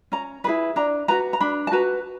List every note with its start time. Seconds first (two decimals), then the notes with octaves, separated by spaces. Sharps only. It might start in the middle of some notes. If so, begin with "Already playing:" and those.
0.12 C#4 A#5
0.44 E4 G#4 B4 B5
0.76 D4 A#5
1.08 F#4 B4 A#5
1.33 A#5
1.41 D4 B5
1.67 A5
1.72 F#4 B4 A#5